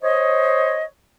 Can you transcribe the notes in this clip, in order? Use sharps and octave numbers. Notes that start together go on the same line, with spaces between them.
C5 C#5 D#5